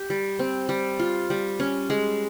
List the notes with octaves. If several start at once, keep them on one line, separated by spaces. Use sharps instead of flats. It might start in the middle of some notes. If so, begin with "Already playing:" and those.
Already playing: G4
G3
C4
G3
F4
G3
C#4
G#3